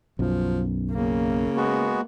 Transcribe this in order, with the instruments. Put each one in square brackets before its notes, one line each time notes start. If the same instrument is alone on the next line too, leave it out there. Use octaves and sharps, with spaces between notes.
[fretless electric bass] B1 F#2 [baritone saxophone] F3
[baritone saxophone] C#3 [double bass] A#3
[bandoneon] G#3 B3 F#4